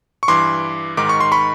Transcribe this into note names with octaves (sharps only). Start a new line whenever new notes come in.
C#6
G2 E3 C6 D6
G#2 D#3 D6
C#6
C6
B5 C#6